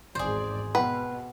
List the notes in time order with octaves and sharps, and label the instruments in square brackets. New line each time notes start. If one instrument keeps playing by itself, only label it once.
[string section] G#1 E2 D5 [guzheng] G#4 C5
[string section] B2 [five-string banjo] B4 [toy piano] F#5 G5